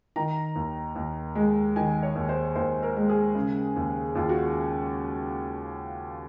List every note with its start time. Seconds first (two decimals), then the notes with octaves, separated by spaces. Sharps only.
0.16 D#3 A#5
0.55 D#2
0.96 D#2
1.35 G#3
1.76 D#3 G#5
2.03 C#5
2.15 D#2
2.29 C5
2.56 D#2 C5
2.83 A#4
2.96 G#3
3.09 G#4
3.35 C#3
3.76 D#2
4.15 D#2 F4
4.29 F#4